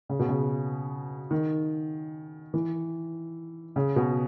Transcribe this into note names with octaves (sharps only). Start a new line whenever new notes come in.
C#3
B2
C#3
D#3
E3
C#3
B2